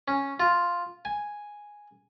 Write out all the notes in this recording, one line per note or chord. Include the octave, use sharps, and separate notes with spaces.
C#4
F4
G#5